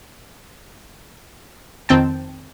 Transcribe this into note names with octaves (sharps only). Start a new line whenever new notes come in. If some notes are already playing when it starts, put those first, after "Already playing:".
F2 D#3 C4 G5 A5